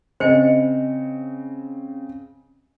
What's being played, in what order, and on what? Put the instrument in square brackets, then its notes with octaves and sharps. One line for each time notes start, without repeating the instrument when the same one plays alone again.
[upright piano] C#3 C4 C#7 [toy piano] C5 D#5